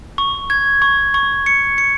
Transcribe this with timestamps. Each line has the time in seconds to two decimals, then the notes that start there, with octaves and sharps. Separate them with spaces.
0.18 C#6
0.50 G#6
0.82 C#6
1.14 C#6
1.46 C#7
1.78 C#7